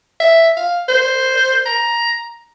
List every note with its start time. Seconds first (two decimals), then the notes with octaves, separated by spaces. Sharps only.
0.20 E5
0.57 F5
0.88 C5
1.66 A#5